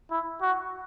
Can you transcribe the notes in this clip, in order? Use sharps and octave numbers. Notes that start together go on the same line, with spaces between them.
E4
F#4